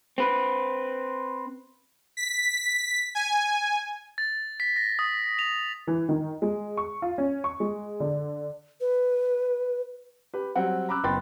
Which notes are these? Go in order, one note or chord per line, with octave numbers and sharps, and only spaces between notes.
C4 B4
B6
G#5
A6
B6
A#6
D#6
F7
E3
D#3
G#3
C#6
F4
C#4
C#6
G#3
D3
B4
G4 B4
F#3 G3 C4 F#5
A#5 B5 D6 E6 F#6
F#1 B3 G5 B5 C6 A6